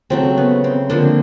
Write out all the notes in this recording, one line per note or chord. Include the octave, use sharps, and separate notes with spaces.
C#3 F#3 A3 C4
B3
C4
D3 F3 A#3 C4 D4